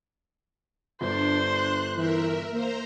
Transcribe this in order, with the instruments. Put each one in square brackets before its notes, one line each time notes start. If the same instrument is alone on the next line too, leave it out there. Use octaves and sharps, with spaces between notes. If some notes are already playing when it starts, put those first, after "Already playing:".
[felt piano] G1 [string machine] D4 [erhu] C5
[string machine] F#6
[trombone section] E3 [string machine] A#4 E5
[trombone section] A#3 [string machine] C5 A#5